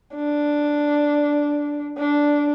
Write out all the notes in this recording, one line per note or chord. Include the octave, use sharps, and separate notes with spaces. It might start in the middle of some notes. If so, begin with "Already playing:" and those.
D4
D4